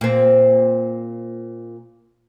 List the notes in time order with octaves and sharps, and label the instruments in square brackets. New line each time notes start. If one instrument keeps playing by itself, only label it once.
[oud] A#2 C4